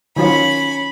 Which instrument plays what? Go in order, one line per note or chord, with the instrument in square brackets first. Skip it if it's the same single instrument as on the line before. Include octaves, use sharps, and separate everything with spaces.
[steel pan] D#3 F#3 F4 [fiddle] C#4 B5